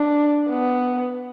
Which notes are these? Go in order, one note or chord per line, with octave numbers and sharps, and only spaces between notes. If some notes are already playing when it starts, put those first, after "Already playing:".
Already playing: D4
B3